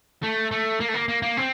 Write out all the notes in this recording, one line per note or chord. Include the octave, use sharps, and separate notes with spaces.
A3
A3
A#3
A3
A#3
A#3
A#3
C4